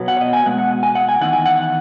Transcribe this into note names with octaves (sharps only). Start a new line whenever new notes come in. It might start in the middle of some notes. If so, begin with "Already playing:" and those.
Already playing: B2 F#3 B3
F#5
C#5
D#5
G#5
B2 G#3 F#5
F#5
G#5
F#5
G#5
E2 D#3 F#5
G#5
F#5